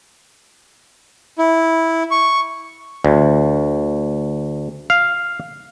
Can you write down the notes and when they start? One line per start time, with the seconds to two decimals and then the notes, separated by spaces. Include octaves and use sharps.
1.39 E4
2.11 C#6
3.04 D2
4.90 F5